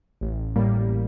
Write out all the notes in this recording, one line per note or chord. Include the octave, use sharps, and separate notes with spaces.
A1
A2 G3 A#3